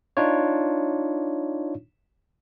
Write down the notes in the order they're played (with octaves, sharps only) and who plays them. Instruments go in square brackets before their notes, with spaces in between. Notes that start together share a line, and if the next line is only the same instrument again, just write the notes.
[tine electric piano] D4 D#4 F4 C#5